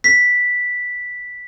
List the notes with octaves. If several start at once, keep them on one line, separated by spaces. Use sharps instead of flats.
B6